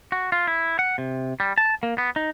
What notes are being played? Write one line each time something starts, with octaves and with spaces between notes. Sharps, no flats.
F#4
F4
E4
F#5
C3
G3
A5
A#3
B3
D#4